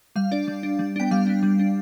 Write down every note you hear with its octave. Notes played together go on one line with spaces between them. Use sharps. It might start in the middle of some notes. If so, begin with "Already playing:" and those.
G3 F5
D4 D5
G3
D4
G3
B3 D4 G5
G3 F5
B3 D4
G3
D4